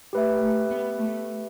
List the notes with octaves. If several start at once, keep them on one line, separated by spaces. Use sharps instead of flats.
A3 G4 B4 E5
A3
B3
A3